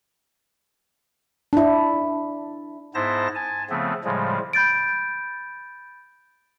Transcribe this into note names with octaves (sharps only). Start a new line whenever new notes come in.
D4 E4
G#2 B3 E4 C5 A5 A#6
G#5 A5
C#3 F3 A3 B3 C4
A2 C#3 F3 G3 G#3
B5 G6 A6 D7